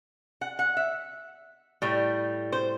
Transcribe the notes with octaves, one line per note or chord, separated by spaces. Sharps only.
F#5
F#5
E5
A2 G3
C5